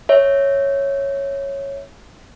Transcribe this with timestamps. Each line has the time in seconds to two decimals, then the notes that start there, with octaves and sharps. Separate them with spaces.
0.09 C#5 E5